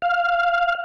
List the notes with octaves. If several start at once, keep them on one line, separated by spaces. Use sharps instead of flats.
F5